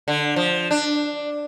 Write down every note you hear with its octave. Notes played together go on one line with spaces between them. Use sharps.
D3
F3
D4